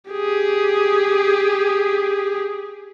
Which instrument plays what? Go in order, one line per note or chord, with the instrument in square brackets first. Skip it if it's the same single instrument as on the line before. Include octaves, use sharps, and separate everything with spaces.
[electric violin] G4 G#4